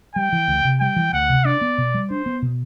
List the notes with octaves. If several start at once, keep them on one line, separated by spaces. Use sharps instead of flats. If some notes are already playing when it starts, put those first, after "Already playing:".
G3 G5
E3
D2
C3
G3 G5
E3
D2 F#5
C3
D4 D5
B3
B2
G3
D4 C5
B3
B2